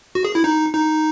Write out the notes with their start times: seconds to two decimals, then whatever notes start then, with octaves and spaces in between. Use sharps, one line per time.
0.15 F#4
0.25 G#4
0.35 E4
0.44 D#4
0.74 D#4